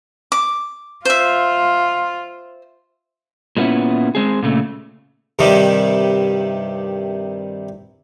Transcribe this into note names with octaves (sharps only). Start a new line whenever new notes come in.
D6
F4 C5 E5
A#2 G#3 B3 C#4 E4
G#3 C4 G#4
A#2 C#3 A3
G2 C3 D#3 G3